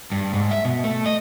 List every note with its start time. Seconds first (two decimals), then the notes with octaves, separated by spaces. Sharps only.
0.12 G2
0.34 G#2
0.51 E5
0.65 B2
0.84 A3
1.06 D#5